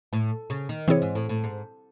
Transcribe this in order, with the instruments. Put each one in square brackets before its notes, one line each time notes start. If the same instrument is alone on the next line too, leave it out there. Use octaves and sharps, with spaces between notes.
[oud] A2
C#3
D#3
[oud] C3 [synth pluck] E3 C4 E4 G#4 C#5
[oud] G#2
A2
A2
G#2